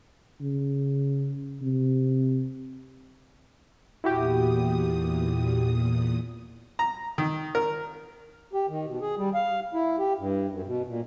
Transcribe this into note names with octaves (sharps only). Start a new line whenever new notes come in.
C#3
C3
E2 A#2 E4 F#4 G4 D#6
A#5
D#3
A#4
G4
D#3
B2
G#4
G3
F5
E4
G4
G2
F#2
B2
A#2